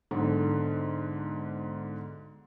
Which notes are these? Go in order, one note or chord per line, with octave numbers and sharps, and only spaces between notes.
B1 G#2 D3 A4